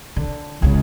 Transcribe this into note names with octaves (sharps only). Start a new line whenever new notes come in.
D3
C#2 C#3